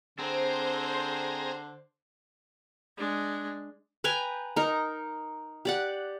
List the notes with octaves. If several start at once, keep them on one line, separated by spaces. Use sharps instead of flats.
D3 C4 G#4 C5 A#5
G#3 D4
B4 G5 G#5 A#5
D#4 A#4
G4 D5 F#5